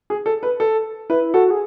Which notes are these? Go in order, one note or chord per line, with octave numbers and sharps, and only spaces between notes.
G#4
A4
B4
A4
E4 B4
F#4 A4
G#4